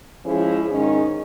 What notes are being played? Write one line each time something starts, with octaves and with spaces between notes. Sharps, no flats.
F3 G#3 C#4 E4 G#4
G#2 D#3 G#3 C#4